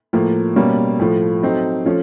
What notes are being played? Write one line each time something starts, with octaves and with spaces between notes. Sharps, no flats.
A2 F3 A#3
B2 G3 A#3 C#4
A2 F3 A3
F#3 A3 C4 D#4
F3 A3 C#4